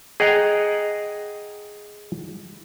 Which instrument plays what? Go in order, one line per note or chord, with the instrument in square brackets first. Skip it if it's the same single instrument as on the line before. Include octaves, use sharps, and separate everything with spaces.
[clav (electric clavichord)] G#4 D#5 F#5 G5 A#5